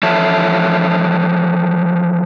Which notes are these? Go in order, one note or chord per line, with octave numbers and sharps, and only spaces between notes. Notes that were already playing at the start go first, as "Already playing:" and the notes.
E3 F3 A4 C#5 E5 A5